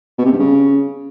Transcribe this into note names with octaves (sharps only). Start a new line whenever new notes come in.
B2
C3
G2
C#3